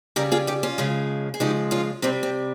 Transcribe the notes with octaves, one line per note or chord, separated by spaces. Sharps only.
C#3 G3 G4 A#4
F4 G#4
D#4 G4
C#4 F4
C#3 F3 G#3
G#4
C#3 F3 G#3 D#4 G4
C#4 F4
C3 G3 C4 D#4
C4